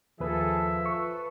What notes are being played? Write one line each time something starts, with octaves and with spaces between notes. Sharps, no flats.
D#2 F3 A#3 G#4 A4 B4 E5
A4 B4 C#6